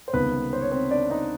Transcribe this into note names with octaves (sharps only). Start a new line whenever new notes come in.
C5
C#2 C3 D#3 G3 B3 C4 B4
C5
C#5
C4 C5
D4 D5
D#4 D#5